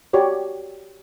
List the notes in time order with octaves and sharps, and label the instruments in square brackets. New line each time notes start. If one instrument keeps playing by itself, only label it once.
[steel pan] F#4 G4 C#5 D5